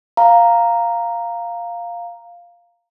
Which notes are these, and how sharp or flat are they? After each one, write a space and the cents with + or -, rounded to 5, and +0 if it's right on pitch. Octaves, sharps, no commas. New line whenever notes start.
F5 +0 A#5 +0